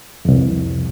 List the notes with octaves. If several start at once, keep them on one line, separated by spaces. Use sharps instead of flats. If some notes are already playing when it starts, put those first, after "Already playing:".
C2 F2